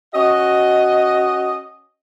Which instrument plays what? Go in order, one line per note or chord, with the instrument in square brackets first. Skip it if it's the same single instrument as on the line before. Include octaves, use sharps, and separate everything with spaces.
[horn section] C#4 F#4 D#5